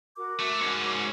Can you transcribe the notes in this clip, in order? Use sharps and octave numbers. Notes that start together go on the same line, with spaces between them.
F#4 A#4 D6
A3
G#2 C#4